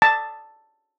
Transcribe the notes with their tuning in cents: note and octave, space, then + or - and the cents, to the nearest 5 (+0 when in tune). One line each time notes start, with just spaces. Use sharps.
A5 +5